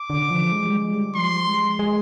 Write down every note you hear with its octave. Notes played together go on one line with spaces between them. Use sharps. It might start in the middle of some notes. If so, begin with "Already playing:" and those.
Already playing: D6
D3
F3
G#3
G3
G#3
G3
F3 C6
G#3
G#3